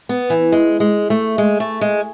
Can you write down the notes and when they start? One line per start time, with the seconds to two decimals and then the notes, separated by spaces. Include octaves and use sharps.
0.09 B3
0.30 E3
0.52 G#3
0.80 G#3
1.10 A3
1.38 G#3
1.60 A3
1.81 G#3